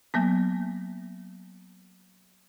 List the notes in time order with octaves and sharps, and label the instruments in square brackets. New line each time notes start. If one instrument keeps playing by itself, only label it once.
[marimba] F#3 A#3 B3